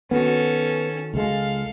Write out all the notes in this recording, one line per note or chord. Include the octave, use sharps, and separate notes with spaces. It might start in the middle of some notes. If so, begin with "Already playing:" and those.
D#3 B3 C#4 F#4 A4
C#2 G#3 A4 F5